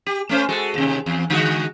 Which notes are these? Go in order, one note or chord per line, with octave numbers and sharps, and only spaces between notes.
G4
A3 C#4 C5
G#3 F#4 A4
D#2 C3
E2
D3 G#3 F#4